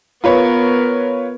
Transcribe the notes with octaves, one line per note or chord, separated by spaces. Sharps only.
B3 F4 A#4 B4 C#5